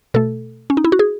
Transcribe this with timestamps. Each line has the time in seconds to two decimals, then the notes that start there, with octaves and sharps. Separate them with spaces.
0.14 B2 A3 A4
0.70 C#4
0.77 D#4
0.84 E4
0.92 F#4
0.99 G#4